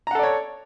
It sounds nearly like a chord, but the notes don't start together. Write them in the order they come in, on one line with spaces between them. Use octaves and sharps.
A#5 F#5 A4 D5 C#5